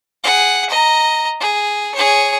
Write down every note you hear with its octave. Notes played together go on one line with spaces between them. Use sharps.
G#4 F#5
D#5 A#5
G#4
G#4 C#5